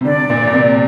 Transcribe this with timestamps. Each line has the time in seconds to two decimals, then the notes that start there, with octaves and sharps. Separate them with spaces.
0.01 C3
0.05 D3 D5
0.30 A#2
0.47 A#2
0.54 C3